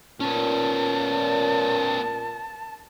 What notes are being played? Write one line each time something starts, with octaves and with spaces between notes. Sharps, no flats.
A#2 B3 C#4 A5